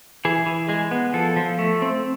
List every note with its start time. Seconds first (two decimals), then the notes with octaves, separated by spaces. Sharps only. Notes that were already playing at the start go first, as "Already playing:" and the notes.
0.25 E3 G#4
0.46 E3
0.69 G#3 G#4
0.91 B3
1.14 F3 A4
1.36 F3
1.59 A3
1.82 C4